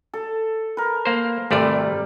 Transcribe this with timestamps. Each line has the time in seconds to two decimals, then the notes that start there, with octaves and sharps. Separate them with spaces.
0.14 A4
0.77 A#4 B4
1.05 A#3 C5
1.51 G#1 C3 G3 A3 D5